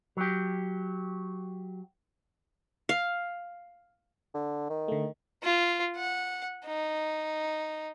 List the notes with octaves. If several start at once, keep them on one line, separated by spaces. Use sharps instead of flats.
F#3 G4
F5
D3
D#3
D3 A3
F4
F#5
D#4